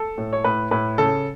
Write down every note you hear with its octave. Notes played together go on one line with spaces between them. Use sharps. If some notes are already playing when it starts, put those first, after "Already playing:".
Already playing: A4
A2
C#5
A2 B4
A2 B4
C#3 A4